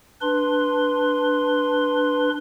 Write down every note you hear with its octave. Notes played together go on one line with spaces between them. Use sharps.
D4 B4 C6